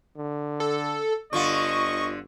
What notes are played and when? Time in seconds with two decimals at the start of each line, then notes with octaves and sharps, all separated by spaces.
0.17 D3
0.60 A4
1.33 G1 D3 F4 D#5 C#6